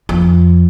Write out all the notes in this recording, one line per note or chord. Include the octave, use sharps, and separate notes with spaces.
F2